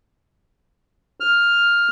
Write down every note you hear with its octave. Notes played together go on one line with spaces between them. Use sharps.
F6